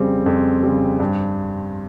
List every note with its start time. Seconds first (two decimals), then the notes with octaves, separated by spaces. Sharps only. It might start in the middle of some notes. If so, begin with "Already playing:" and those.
Already playing: F2 C#3 G3 C4
0.26 F2
0.63 C#3 G3
1.00 G2